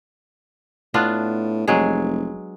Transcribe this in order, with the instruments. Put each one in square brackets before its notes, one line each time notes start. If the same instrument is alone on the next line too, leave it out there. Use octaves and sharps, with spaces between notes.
[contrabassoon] A2 [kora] B3 D4 F4
[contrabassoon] F1 [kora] F#3 G#3 G#4